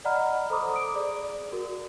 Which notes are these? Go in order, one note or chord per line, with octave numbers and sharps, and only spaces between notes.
D5 D#5 F#5 A#5 B5 F6
A4 C5 A#5 B5 D6 D#6
D#6 D7
G#4 D5
F#4 A#4